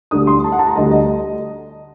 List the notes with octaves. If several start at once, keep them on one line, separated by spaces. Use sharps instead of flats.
D2 D3 G3 D4 D#6
C6
A5
F#5
A5
A#5
D2 D3 G3 D#5
D#5